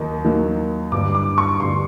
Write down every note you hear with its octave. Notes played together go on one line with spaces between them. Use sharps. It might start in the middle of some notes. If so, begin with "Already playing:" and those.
Already playing: D#2 D#3 F#3 A#3 D#4
D#2 D#3 F#3 A#3 D#4
G2 D3 G3 D6
D6
C#6
G2 D3 G3 C6